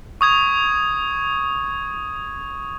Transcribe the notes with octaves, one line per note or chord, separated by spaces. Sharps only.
C#6 D#6 G#6 F7